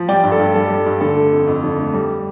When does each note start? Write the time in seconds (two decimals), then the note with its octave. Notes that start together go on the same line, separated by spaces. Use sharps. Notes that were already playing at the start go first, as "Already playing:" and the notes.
Already playing: F3
0.08 G3 D5 G5
0.24 G2
0.32 A4
0.39 G2
0.55 G3 A4
0.70 G3
0.86 G2
1.01 D3 A4
1.17 A3
1.32 F2
1.47 F2
1.63 D3
1.78 A3
1.94 G3